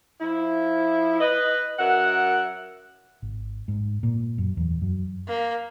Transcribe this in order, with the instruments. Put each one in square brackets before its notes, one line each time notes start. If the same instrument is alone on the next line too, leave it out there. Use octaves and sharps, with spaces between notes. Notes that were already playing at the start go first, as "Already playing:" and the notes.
[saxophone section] F3 E4
B4 D#5
F#2 A#4 E5 F#5
[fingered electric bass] G#1
G#2
A#2
F#2
E2
F#2
[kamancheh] A#3